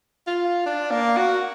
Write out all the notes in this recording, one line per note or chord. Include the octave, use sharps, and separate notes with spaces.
F4
D4
A#3
F#4